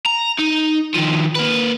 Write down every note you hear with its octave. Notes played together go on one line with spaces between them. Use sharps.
A#5
D#4
D#3 F3
A#3 B4